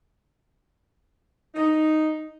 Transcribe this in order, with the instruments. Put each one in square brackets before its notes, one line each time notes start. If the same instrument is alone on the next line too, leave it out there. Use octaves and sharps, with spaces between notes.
[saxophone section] D#4